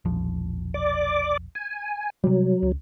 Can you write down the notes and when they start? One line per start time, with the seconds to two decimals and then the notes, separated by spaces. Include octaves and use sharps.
0.05 E1 A#1 F3
0.74 D5 D6
1.55 G#5
2.24 C3 F#3 G3
2.63 C#2